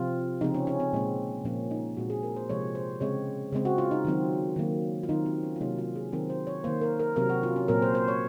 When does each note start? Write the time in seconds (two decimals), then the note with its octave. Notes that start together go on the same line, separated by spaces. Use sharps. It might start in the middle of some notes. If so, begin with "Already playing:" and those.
Already playing: C3 F3 C4 F4
0.41 C#3 F3 C4 D#4
0.54 C#4
0.67 C#4
0.80 C4
0.93 A#2 G#3 C4
1.45 A#2 F3 A#3 C#4
1.71 D#4
1.97 A#2 G#3 C4 F#4
2.10 G#4
2.23 A#4
2.36 C5
2.49 C3 F3 G#3 C4 C#5
2.75 C5
3.00 C#3 G#3 C4 C#5
3.53 C#3 G#3 C4
3.65 F#4
3.78 F4
3.91 D#4
4.05 D#3 F#3 C4
4.56 D#3 F#3 A#3
5.03 F4
5.09 D#3 F#3 C4 D#4
5.26 C4
5.43 C#4
5.56 F4
5.61 C3 F#3 A#3 D#4
5.78 F4
5.96 G#4
6.12 D#3 F#3 C4 A#4
6.30 C5
6.47 C#5
6.64 D#3 A#3 C5
6.81 A#4
7.00 A#4
7.16 C3 F#3 C4 A#4
7.30 F#4
7.43 F4
7.56 C#4
7.68 A#2 F#3 C4 A#4
7.82 C5
7.95 C5
8.08 C#5